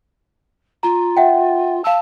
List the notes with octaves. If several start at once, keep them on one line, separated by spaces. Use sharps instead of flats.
F4 A#5
E5 F#5 G5
F5 A5 E6